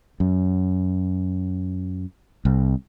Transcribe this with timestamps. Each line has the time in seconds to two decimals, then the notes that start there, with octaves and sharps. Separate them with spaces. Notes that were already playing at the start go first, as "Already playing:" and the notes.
0.20 F#2
2.45 C2